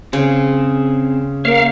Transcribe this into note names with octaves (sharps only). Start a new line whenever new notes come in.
C#3 C4 G#4
A#3 A#4 C#5 F5